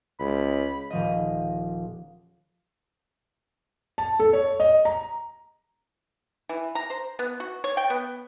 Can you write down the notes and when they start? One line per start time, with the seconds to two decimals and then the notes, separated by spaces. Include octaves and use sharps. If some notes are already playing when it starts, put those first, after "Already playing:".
0.20 C#2 B5
0.90 D#1 F3 D#5
3.98 A5
4.20 A4
4.33 C#5
4.60 D#5
4.85 A#5
6.49 E3
6.75 A#5
6.90 C5
7.19 B3
7.40 F#4
7.64 C#5
7.77 G5
7.90 B3